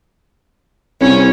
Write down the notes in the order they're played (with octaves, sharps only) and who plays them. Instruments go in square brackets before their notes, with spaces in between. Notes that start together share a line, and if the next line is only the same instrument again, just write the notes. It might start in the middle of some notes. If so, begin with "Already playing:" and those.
[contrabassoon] C2 [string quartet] C#4